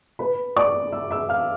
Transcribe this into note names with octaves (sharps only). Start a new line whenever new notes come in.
B4 B5
D5 D6
E5 E6
E5 E6
F5 F6